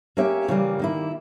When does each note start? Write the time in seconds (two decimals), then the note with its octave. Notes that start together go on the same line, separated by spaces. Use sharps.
0.17 A#3 C#4 G4 C#5 E5
0.48 C#3 E3 G3 A#3
0.79 D#3 A#3 E4